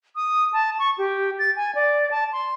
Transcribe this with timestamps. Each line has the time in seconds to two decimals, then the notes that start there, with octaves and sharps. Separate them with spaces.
0.16 D#6
0.53 A5
0.79 C#6
0.98 G4
1.39 A6
1.56 G#5
1.75 D5
2.11 A5
2.32 C6